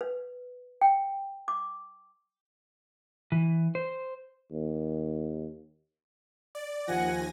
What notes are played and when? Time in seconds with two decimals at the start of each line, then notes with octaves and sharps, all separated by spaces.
0.01 B4
0.81 G5
1.48 D6
3.32 E3
3.75 C5
4.52 D#2
6.55 D5
6.88 D#2 F3 F#5 G#5 A#6